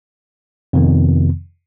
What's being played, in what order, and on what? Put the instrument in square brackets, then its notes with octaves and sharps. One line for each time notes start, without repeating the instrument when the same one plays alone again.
[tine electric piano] F2 C3 D#3 B3